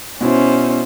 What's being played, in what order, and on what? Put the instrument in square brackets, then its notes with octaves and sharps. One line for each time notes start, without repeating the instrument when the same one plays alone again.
[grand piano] B2 E4 [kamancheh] C#4 C5